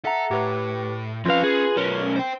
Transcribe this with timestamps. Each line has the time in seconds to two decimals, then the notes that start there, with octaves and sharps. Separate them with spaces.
0.05 A4 E5 F#5 A#5
0.31 A2 G4 B4
1.25 F2 C#4 F4 B4 F5
1.44 G#4
1.77 B1 C#4 A#4
2.16 C5 G5